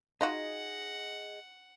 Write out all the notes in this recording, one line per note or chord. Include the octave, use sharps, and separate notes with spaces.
D#4 F4 F#4 G#4 D#5 F#5